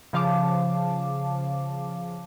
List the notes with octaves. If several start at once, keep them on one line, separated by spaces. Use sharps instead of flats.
C#3 F3 F5 A5 D6